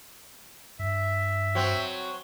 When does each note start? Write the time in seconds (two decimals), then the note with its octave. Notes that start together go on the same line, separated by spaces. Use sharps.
0.79 G2 E5
1.55 F#3 C4